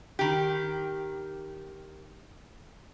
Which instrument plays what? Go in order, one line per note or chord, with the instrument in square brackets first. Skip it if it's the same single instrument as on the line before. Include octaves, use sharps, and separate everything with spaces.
[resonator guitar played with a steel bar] D#3 G4